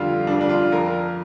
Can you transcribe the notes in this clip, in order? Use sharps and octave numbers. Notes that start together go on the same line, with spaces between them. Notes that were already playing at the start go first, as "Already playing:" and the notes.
Already playing: F2 D3 G3 F4
F2 D3 G3 D4
D4
F4
F2 F3 A#4